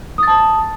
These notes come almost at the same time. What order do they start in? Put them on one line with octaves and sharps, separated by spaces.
D#6 A6 A5